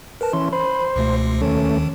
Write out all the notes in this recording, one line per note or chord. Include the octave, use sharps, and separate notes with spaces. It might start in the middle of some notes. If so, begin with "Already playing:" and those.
A#4 B4 A5
E3 C#4 C6
C5 B5
C#2 B2 A3
D#2 D#3 A3 C#4